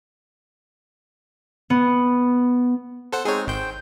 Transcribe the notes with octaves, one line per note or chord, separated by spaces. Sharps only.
B3
A4 C5 F#5
G#3 C4 D#4 G#4 C#5
G#1 C5 G5 G6